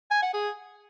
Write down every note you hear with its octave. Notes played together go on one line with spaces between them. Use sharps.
G#5
F#5
G#4